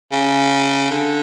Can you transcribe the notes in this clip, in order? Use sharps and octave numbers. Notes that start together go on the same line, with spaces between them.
C#3
D3